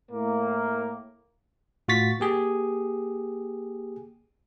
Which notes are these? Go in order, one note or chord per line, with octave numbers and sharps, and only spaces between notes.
A2 A#3
A2 F4 F#4 C#6 A6 B6
A#3 G4 G#4